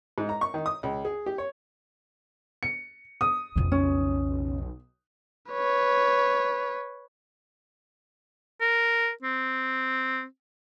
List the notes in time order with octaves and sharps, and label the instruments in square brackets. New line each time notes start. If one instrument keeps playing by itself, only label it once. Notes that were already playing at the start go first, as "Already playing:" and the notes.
[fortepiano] G#2
A#5
C#6
D#3
D#6
C#2
G#4
G4
C#5
[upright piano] C#7
D#6
[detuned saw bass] E1 [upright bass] F2 C#3
[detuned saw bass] B1 [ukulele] C#4
[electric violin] B4 C#5
[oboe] A#4
C4